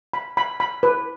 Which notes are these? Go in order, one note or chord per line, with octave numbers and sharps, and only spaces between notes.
B5
B5
B5
B4